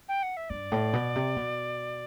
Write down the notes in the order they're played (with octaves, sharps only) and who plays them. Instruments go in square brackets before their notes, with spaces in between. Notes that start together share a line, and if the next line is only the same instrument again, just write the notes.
[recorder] G5
F#5
E5
[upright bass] G2 [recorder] D5
[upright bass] A2
B2
C3
B2